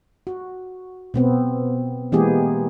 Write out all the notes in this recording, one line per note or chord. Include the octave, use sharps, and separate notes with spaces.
F#4
B2 B3 C4
E3 G#3 A#3 B3 G4 G#4